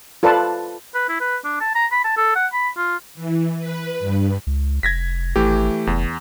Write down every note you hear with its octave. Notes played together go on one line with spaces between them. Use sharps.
F4 A4 B4 D5 A5
B4
E4
B4
D4
A5
A#5
B5
A5
A4
F#5
B5
F4
E3
B4
G2
C#2
F1 G#6 A#6 B6
G#1 E3 A3 G4
F1 E2